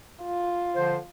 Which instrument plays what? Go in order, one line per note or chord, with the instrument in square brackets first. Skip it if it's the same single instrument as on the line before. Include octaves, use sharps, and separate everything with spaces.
[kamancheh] F4
[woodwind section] D3 F3 C5